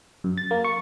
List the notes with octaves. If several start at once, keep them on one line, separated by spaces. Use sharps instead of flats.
F#2
A6
A#3
C#6